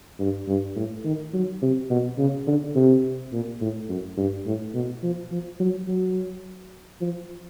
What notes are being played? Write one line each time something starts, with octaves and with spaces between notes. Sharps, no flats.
G2
G2
A2
D#3
F#3
C3
B2
C#3
D3
C3
A#2
A2
F#2
G2
A2
B2
F3
F3
F#3
F#3
F3